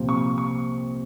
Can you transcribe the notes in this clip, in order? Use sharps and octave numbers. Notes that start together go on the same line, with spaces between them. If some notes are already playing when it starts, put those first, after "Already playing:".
Already playing: C2 A#2 F3 C4
C#6
C#6